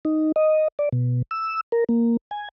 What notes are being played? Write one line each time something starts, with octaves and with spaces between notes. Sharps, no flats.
D#4
D#5
D5
B2
E6
A#4
A#3
G#5